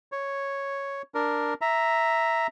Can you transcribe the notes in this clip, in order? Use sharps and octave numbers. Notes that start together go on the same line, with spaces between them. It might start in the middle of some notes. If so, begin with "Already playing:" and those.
C#5
D4 A#4
E5 A#5